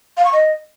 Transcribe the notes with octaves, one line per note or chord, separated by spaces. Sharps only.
F5
C#6
D#5